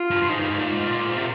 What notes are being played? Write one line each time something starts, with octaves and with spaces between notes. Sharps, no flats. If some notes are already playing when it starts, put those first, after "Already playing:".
Already playing: F4
G2
G2
G#2 D#4
G2
G#2
A#2
G#2 F4
A#2
G#2
C3